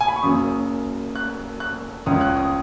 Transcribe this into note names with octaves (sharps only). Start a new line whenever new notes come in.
G#5
B5
C#6
F#1 F#2 C#3 D#6
F#6
F#6
C#2 C#3 D#6
F#6
D#6